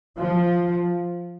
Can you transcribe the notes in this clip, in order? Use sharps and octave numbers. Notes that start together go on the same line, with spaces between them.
F3